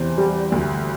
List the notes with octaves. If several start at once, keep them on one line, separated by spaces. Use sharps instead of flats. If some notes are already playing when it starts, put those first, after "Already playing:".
Already playing: E2 C3 C5
G3
D2